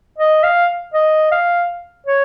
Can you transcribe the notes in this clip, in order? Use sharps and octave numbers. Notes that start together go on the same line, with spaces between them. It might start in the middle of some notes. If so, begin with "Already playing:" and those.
D#5
F5
D#5
F5
C#5